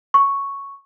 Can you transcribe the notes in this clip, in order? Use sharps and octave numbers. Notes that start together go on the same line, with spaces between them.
C#6